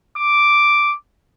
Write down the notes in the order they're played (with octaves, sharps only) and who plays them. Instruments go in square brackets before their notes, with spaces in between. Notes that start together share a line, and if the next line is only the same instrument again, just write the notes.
[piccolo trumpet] D6